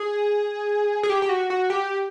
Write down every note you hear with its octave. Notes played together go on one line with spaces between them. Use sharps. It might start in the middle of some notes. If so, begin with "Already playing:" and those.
Already playing: G#4
G#4
G4
G4
F#4
F#4
G4